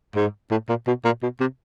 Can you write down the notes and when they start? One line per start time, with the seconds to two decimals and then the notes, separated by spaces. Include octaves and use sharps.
0.15 G#2
0.51 A2
0.69 A#2
0.87 B2
1.05 A#2
1.23 B2
1.40 C3